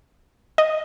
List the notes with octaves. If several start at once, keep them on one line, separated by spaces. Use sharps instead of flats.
D#5